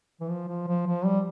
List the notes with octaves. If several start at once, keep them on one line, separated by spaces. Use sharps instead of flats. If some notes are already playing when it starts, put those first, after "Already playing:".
E3
F3
F3
F3
F3
G3